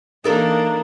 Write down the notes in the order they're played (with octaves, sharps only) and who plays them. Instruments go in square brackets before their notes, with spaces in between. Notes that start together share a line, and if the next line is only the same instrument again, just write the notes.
[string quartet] E3 A#3 D4 [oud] D#4 A4 A#4